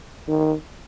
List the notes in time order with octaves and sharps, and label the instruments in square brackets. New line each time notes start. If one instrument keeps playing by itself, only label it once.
[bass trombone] D#3